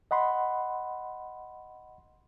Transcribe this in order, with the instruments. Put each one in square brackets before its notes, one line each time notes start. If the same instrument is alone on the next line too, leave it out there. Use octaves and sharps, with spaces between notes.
[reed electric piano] D#5 F#5 B5 C6